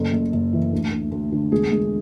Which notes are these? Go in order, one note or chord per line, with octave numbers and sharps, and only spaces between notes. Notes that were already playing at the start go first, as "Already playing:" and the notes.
Already playing: F#1 A4
F#1
F#1
E3
D2
D2
D2
D3
E1 G#4
E1